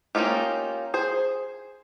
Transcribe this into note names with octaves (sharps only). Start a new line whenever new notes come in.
A#3 C#4 D#4 F4 G4
G#4 C5